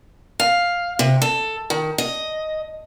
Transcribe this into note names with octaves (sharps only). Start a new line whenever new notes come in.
F5
C3
A4
D#3
D#5